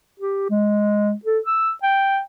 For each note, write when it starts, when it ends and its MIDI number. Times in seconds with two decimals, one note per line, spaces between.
0.20 0.46 67
0.50 1.13 56
1.25 1.39 69
1.46 1.72 88
1.83 2.20 79